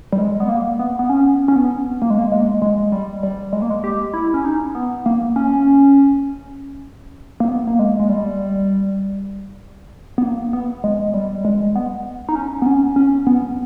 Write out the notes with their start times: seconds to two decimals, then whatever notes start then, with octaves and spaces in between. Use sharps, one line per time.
0.13 G3
0.18 G#3
0.40 B3
0.49 A#3
0.79 B3
0.99 B3
1.09 C#4
1.48 C#4
1.56 B3
2.02 A#3
2.10 G#3
2.19 A#3
2.32 G#3
2.62 G#3
2.92 G3
3.23 G3
3.53 G#3
3.62 A#3
3.70 G#3
3.84 G4
4.14 E4
4.34 C#4
4.45 D#4
4.75 B3
5.06 A#3
5.36 C#4
7.40 A#3
7.48 B3
7.67 A#3
7.79 G#3
7.99 G#3
8.09 G3
10.18 B3
10.23 A#3
10.53 B3
10.84 G#3
11.14 G3
11.45 G#3
11.75 B3
12.29 D#4
12.35 C#4
12.62 B3
12.66 C#4
12.96 C#4
13.27 B3